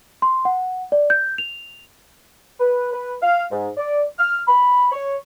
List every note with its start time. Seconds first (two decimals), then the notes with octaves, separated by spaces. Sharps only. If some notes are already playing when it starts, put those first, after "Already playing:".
0.22 C6
0.45 F#5
0.92 D5
1.10 G6
1.38 F7
2.60 B4
2.93 B4
3.22 F5
3.52 G#2
3.78 D5
4.19 F6
4.48 B5
4.92 C#5